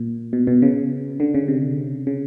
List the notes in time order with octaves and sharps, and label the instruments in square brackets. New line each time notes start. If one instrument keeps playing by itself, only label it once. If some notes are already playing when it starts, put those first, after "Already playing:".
Already playing: [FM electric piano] A#2
B2
B2
C#3
D3
C#3
C3
C#3